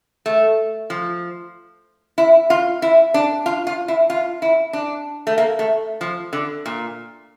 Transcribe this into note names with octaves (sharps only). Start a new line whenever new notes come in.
A3
F3
E4
F4
E4
D4
F4
F4
E4
F4
E4
D4
A3
A#3
A3
F3
D3
A#2